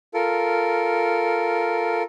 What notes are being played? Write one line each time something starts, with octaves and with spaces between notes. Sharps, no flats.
F4 A4 A#4